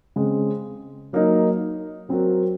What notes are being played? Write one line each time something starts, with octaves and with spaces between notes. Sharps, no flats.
C#3 G#3 C4
F#3 A#3 D#4
F#3 C4 F#4 A#4